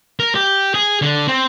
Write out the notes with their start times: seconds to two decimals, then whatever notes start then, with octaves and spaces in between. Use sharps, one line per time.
0.20 A#4
0.35 G4
0.74 G#4
1.02 D3
1.28 C4